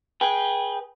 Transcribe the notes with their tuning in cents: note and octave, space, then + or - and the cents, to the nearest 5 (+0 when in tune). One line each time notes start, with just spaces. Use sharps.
G#4 +0 B4 -25 G5 +0